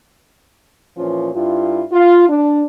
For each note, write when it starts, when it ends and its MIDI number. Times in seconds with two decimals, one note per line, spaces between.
0.96 1.29 46
0.96 1.29 52
0.96 1.29 53
0.96 1.29 61
0.96 1.29 65
1.34 1.82 43
1.34 1.82 64
1.34 1.82 65
1.92 2.26 65
2.28 2.63 62